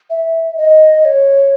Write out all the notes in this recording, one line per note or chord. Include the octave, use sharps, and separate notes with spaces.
E5
D#5
C#5